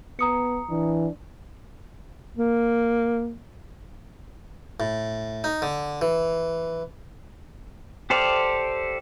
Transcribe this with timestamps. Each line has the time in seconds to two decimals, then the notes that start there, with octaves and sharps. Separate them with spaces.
0.19 B3 A#5 D#6 C#7
0.70 E3 D4
2.37 A#3
4.80 A2
5.44 D#4
5.62 D3
6.01 E3
8.10 G4 A4 C5 D5 F5